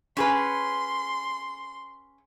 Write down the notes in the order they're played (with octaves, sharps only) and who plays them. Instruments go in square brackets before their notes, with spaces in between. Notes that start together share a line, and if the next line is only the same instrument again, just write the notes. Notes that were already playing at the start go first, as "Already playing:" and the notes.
[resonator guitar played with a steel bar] C#4 G#4 B4 [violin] C6